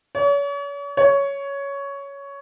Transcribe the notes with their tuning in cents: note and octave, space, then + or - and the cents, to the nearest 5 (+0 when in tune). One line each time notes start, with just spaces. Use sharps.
C#5 +40
C#5 +10